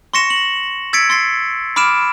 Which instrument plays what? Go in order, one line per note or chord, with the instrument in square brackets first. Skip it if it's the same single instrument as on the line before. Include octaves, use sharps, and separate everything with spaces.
[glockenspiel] C6 C#6 A#6 C#7 E7
F#7
E6 G#6 A6 B6 C#7 D7
C6 A6 C7
B5 D6 F6 D7 E7